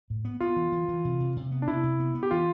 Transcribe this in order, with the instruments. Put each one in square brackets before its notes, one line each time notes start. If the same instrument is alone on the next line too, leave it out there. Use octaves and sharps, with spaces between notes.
[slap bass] A2
B3
[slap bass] B3 [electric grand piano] F4
[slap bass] E3
E3
E3
C3
C3
C3
B3
[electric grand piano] D4
[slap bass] C3 [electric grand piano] E4
[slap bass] C3
B3
B3
[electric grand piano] G4
[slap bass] E3 [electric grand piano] F4